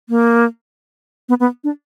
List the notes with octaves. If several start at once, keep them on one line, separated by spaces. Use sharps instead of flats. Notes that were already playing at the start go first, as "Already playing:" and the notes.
A#3
B3
B3
D4